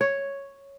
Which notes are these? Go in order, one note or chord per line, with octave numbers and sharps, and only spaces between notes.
C#5